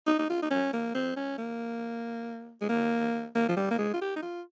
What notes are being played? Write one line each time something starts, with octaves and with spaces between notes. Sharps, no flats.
D#4
D#4
F4
D#4
C#4
A#3
C4
C#4
A#3
G#3
A#3
A#3
F3
G3
A#3
G#3
F4
G4
D#4
F4